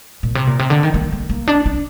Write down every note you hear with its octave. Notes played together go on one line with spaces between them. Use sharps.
A#2
C3
A#2
C3
D3
D#3
A#3
A#3
A#3
D4
D4